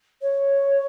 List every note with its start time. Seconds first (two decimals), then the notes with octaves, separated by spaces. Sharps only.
0.22 C#5